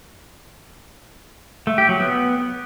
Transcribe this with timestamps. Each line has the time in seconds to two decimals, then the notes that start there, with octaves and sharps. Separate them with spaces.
1.67 A3
1.78 G4
1.89 F#3
2.00 B3